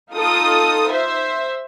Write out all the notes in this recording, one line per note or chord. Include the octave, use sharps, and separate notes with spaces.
D#4 F4 A4 D#6
C5 E5